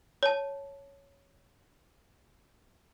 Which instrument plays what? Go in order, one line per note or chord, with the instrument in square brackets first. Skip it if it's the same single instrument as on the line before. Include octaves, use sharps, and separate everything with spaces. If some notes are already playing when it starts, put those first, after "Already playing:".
[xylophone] C#5 A5